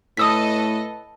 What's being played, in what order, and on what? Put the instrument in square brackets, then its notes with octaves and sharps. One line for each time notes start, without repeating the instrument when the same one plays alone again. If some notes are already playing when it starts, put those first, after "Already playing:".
[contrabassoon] A2 [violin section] A4 B4 D#5 [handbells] D#6 E6 B6